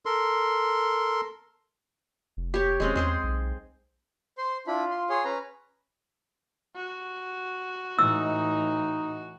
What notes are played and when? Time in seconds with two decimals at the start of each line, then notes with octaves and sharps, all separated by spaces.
0.06 A4 A#4 C6
2.37 F1
2.54 G4 C#5
2.80 E1 G#3 C4 C#4
2.95 E2 G#3 G#4 C5
3.23 B1
4.38 C5 C6
4.67 D4 E4 F4 B5
4.91 C6
5.09 G#4 C#5 C6
5.25 C#4 B4 A#5
6.75 F#4
7.99 A2 E3 D#4 E6